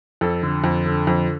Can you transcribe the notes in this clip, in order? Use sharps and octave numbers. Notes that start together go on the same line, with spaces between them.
F2 A4
D3
F2
D3
F2